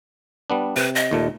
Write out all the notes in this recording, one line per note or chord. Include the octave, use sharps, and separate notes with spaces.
G3 B3 D4
C3 B4
D#5
D#2 A#2 A3